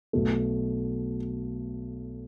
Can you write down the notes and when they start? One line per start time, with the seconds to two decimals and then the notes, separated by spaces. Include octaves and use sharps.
0.13 B1 B2 A3